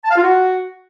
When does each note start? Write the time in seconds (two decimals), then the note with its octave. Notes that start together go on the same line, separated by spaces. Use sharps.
0.04 A5
0.11 F5
0.17 F4
0.23 F#4